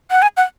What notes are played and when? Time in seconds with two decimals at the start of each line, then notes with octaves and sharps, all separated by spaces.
0.11 F#5
0.22 G#5
0.37 F#5